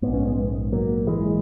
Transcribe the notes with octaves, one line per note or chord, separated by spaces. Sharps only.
A#1 G#2 B3
C#4
G#3 B3
F#3 A#3
E3 G#3